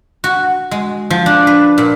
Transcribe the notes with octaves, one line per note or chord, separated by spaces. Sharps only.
F#4
G#3
F3
D4
B4
A#2